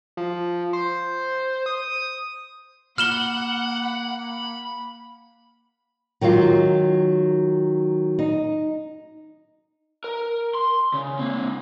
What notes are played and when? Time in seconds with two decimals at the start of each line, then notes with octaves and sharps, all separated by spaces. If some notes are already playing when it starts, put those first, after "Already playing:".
0.17 F3
0.73 C5
1.66 D#6
2.98 A#3 F#5 B5 F6 E7 G7
6.21 D#3 F#3 G#3 F4
8.19 D#4
10.04 A#4
10.55 C6
10.94 C#3
11.19 A#3 C4